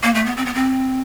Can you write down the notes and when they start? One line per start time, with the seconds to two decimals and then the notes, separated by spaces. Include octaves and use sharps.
0.03 A#3
0.14 A3
0.25 B3
0.37 C4
0.46 B3
0.54 C4